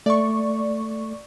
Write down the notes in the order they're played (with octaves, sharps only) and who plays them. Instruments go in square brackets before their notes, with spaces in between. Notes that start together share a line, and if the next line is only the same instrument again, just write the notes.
[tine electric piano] A3 [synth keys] D5 C#6